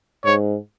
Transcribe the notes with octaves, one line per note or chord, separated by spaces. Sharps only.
G#2 C#5